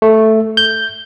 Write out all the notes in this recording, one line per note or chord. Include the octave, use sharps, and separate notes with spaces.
A3
G6